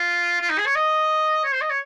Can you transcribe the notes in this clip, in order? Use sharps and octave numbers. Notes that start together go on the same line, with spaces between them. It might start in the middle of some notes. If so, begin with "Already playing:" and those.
Already playing: F4
F4
D#4
G#4
C#5
D#5
C#5
C5
D#5
C#5